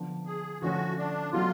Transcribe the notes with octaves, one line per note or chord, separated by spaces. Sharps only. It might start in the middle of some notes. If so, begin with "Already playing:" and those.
Already playing: D3 F3 B3 D4
G#4
D3 F3 A3 C#4 F#4
D4
B2 F#3 A3 F4